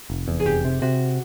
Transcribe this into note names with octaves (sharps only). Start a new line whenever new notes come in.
F1
E2
G#4
F1 G4
C3
C3 F#4